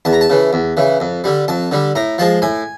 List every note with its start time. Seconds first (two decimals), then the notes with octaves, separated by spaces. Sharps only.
0.05 E2 A5
0.13 A#5
0.21 A5
0.30 C#3 E3
0.53 E2
0.77 C#3 E3
1.00 F2
1.24 D3 G3
1.48 F2 A5
1.71 D3 G3
1.95 A2 A#5
2.18 F3 G#3 A5
2.42 A2 G#5